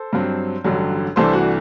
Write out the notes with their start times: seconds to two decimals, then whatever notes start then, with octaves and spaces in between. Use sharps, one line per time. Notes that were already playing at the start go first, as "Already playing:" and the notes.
Already playing: A4 C5
0.13 G2 F#3 C4
0.64 A1 G2 D3 F#3
1.16 C2 C3 E3 A3 D4 A4 C5
1.33 F#4